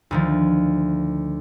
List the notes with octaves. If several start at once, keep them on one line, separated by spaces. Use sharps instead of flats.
D2 D#3 F3